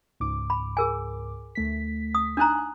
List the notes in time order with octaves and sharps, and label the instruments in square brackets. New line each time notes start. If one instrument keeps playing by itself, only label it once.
[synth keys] C#2 G#2 D6
[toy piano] B5
G#4 A#4 G#5
[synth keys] D2 A3 B6
[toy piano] D#6
[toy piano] D4 D#4 A#5 [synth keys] G#5 D#6 F#6